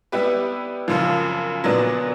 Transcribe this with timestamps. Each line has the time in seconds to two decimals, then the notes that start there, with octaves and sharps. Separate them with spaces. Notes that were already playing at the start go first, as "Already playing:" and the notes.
0.12 G3 B3 E4 G4 B4
0.88 F#2 C#3 F3
1.64 A#2 F#3 B3 D4